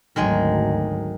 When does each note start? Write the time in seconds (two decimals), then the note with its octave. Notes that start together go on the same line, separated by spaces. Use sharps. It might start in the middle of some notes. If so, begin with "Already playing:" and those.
0.16 G#1 D2 D#3 F#3 G#3 G#4